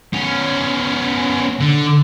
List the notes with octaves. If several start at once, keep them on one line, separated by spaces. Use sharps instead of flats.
B3 C#4
D3